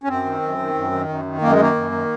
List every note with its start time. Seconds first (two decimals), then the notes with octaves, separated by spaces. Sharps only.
0.04 C#4
0.08 F#2 C4
0.25 D#3
0.42 F#2
0.58 D#3
0.75 F#2
0.92 D#3
1.09 F#2
1.25 D#3
1.42 F#2 A#3
1.52 G#3
1.58 D#3 A#3
1.76 F#2
1.92 D#3